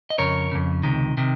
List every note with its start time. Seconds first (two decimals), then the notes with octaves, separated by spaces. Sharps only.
0.10 D#5
0.18 F2 C#3 A#4 C#5
0.52 F2 C#3
0.83 C#2 C3 D#3
1.17 C3 D#3